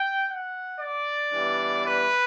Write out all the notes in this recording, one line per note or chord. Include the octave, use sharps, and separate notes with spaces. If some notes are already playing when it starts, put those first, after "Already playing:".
Already playing: G5
F#5
D5
E3 G3 B3 D4
B4